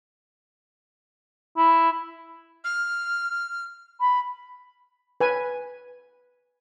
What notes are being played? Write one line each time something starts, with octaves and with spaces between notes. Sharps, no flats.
E4
F6
B5
B4 G#5